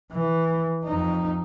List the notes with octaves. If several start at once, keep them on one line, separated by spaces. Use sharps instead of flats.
E3
F2 D#4